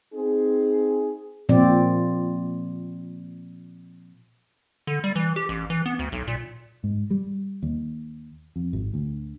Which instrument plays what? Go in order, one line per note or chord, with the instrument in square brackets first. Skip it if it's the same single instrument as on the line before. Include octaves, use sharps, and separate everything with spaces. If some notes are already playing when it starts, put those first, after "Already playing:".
[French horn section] C4 D#4 G#4
[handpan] A#2 F3 C4 D5
[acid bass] D3
G3
E3
G4
A1
E3
B3
D2
B1
A#2
[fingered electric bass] G#2
G3
D#2
F2
G#1
D2